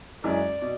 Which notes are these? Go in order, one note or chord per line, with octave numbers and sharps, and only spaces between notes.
F#2 E3 G#3 C#4 D5
B2